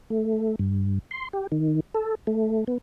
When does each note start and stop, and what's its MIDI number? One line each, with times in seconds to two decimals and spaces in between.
0.10 0.55 57
0.59 0.99 43
1.11 1.28 84
1.33 1.47 67
1.52 1.80 51
1.95 2.15 69
2.27 2.64 57
2.67 2.78 59